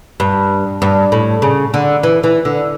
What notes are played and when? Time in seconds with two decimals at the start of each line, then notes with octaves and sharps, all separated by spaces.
0.20 G2
0.82 G2
1.12 A2
1.42 C#3
1.74 D3
2.03 E3
2.23 E3
2.45 D3